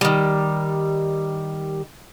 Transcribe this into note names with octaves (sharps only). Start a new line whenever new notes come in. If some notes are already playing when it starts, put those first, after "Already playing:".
D#3 G3